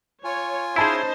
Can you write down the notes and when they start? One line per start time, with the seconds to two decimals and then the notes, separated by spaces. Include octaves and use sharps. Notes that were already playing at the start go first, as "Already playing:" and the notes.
0.24 F4 C#5 G#5
0.76 C#4 D#4 E4 G#4 C5 A5 B5 E7